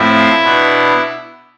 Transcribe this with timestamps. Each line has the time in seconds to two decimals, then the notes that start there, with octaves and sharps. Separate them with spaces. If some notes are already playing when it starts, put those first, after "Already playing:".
Already playing: A2 F3 C4 E4 E5
0.42 B2 B3 D4